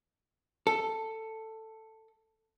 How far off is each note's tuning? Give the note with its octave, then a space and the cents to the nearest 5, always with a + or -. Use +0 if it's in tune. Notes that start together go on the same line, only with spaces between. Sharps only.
A4 +10